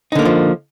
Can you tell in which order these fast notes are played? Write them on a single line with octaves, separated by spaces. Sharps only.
D#4 D3 A#3 D#3 F3